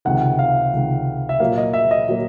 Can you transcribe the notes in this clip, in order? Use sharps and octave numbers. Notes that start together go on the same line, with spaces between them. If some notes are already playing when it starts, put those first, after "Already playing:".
C#2 C3 D#3 F#5
F5
C#2 C3 D#3
E5
A#2 F#3 A#3 F5
D#5
E5
D#5
A#2 F#3 A#3